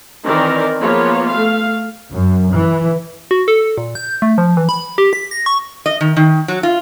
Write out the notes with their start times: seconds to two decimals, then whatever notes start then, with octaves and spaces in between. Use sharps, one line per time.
0.25 D#3 E3 C4 A#4 D5
0.81 F3 A#3 B3 F4 G#4 C#5
1.29 A3 F5
2.12 F#2
2.51 E3
3.31 F#4
3.48 A4
3.78 A#2
3.95 G6
4.22 A3
4.38 F3
4.57 E3
4.69 B5
4.98 G4
5.13 B6
5.31 A#6
5.46 C#6
5.86 D#5
6.01 D#3
6.17 D#3
6.48 F#3
6.63 F4